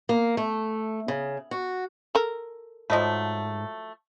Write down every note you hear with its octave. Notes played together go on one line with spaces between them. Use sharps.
A#3
A3
C#3
F#4
A4 A#4
G#2 F3 F#3 A3 D#5 B5